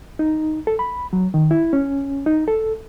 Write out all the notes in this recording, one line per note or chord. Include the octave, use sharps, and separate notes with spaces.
D#4
A4
B5
F#3
D#3
E4
C#4
D#4
A4